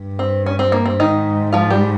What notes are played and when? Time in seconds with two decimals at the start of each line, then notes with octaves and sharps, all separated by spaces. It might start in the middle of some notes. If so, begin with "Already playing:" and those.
Already playing: G2
0.19 C4
0.46 C#4
0.59 C4
0.72 A#3
0.86 C4
1.00 G#2 D#3 D#4
1.53 F3 F4
1.70 G3 G4